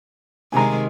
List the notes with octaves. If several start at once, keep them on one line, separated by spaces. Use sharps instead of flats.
C3 D#3 G#3 G#5 A#5